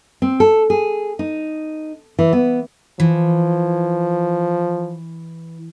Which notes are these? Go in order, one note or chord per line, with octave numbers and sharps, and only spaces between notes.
C4
A4
G#4
D#4
E3
B3
E3 F3